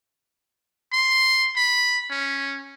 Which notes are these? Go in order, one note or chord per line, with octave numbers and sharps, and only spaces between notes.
C6
B5
C#4